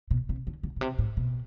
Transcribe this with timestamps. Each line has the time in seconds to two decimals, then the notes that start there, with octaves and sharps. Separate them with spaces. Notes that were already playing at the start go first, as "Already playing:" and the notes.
0.11 B2
0.29 C3
0.47 D3
0.63 D3
0.76 B2
0.81 C3
0.98 A2
1.17 B2